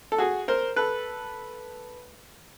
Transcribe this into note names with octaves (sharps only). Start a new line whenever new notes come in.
A4
F#4 G#4
A#4 C5
A4 B4